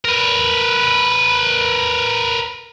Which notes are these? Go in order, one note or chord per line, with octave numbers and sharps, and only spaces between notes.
A#4 B4